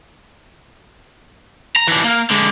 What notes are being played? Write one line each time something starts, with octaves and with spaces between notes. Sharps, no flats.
A#5
E3 D4
A#3
D3 G#3